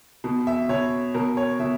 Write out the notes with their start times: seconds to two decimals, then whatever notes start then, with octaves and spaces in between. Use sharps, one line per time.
0.24 B2
0.47 E5
0.69 B2 C#5
1.14 B2 A#4
1.37 C#5
1.60 B2 E5